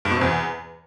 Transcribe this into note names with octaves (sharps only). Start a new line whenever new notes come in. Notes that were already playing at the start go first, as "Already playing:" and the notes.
G2
B2
C3
E2